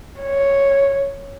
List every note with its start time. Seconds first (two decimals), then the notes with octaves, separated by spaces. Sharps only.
0.21 C#5